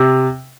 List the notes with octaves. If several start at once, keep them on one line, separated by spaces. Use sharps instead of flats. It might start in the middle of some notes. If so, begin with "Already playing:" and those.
Already playing: C3